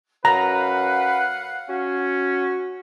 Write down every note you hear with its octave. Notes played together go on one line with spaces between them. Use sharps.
F#2 B4 F5 F#5 A#5
C#4 F#4